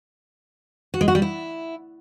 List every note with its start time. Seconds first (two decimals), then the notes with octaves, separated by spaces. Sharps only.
0.94 F#4
1.01 G#3
1.08 F#4
1.15 G3
1.22 E4